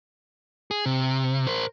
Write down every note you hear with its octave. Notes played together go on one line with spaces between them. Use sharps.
G#4
C3
A#4 C5